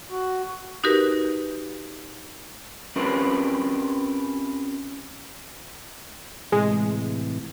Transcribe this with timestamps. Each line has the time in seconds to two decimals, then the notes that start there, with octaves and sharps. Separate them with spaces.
0.11 F#4
0.84 D#4 F#4 G4 A#4 B4
2.96 C4 C#4 F4 G4 A#4 B4
6.52 A2 C3 E3 G#3